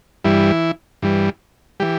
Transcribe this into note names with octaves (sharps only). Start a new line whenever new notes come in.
G2 E3 G3 E4
G2 E3 G3
E3 G3 G4